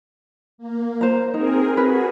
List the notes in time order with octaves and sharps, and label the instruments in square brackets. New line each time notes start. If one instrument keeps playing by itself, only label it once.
[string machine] A#3
[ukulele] C5 A#5
[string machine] C4 G#4 A#4 [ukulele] D#4
[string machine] F#4 G#4 [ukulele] A#4 B4